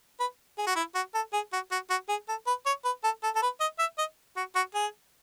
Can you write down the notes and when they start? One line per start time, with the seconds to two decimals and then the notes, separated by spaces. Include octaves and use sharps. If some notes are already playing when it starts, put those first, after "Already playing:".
0.20 B4
0.58 G#4
0.67 F#4
0.76 E4
0.95 F#4
1.15 A4
1.33 G#4
1.53 F#4
1.72 F#4
1.90 F#4
2.09 G#4
2.29 A4
2.47 B4
2.66 C#5
2.85 B4
3.04 A4
3.23 A4
3.36 A4
3.42 B4
3.60 D#5
3.79 E5
3.98 D#5
4.37 F#4
4.55 F#4
4.74 G#4